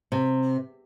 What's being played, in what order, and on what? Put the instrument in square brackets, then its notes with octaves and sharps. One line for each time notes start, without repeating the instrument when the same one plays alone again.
[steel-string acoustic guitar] C3